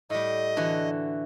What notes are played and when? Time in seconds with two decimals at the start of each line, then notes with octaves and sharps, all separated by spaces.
0.10 A2 G3 D#5
0.56 D3 E3 F#4